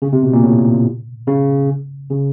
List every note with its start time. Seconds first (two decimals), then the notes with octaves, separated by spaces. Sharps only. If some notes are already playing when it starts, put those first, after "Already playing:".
0.02 C#3
0.12 C3
0.23 B2
0.33 A#2
0.43 A2
1.27 C#3
2.10 C#3